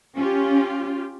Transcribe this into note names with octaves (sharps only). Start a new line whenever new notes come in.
C#4 F4 G4